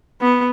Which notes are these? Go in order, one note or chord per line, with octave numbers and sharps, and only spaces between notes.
B3